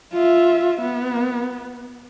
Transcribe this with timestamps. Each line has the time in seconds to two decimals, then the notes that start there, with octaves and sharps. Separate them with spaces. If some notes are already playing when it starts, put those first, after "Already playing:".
0.13 F4 E5
0.81 B3